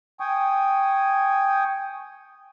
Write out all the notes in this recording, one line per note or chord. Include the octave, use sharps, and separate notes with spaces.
G5 G#5 C#6 D#6